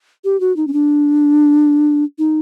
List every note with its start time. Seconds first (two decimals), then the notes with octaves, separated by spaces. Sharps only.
0.24 G4
0.40 F#4
0.57 D#4
0.67 C#4
0.73 D4
2.19 D#4